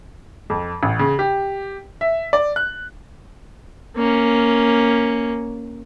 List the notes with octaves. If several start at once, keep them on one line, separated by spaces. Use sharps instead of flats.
F2
A1
C#3
G4
E5
D5
F#6
A#3 C#4